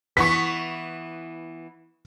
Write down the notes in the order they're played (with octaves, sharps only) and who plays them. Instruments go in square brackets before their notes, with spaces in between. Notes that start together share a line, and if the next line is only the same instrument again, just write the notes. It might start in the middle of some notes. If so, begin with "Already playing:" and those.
[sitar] E3 B3 [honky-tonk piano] C#6 B6